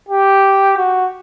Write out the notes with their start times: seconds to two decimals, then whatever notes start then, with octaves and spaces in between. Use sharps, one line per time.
0.09 G4
0.78 F#4